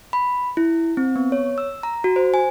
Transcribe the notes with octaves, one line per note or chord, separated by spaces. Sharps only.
B5
E4
C4
B3
C#5
E6
A#5
F#4
C5
G#5